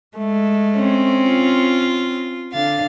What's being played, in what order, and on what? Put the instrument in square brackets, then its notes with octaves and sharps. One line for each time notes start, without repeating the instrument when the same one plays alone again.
[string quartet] G#3 A3
[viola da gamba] C4 C#4
[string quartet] F4
D3 F5 A6